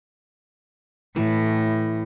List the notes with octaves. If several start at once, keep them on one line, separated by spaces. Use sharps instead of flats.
A2 E3